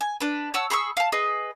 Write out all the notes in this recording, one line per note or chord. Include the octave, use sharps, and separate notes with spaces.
G#5
D4 B4
C#5 F#5 A5 E6
G#4 B5 C#6 E6
F5 A5
G#4 B4 D#5